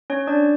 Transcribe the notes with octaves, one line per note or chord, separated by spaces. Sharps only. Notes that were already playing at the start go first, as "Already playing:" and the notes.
C#4 C#5
D4 D5